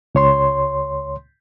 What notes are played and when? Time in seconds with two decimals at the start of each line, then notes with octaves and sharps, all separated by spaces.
0.15 C#2 C#5 C6